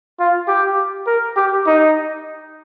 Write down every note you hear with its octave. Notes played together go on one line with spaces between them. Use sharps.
F4
G4
A#4
G4
D#4